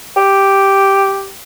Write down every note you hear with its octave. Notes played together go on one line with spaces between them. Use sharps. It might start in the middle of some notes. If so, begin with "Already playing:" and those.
G4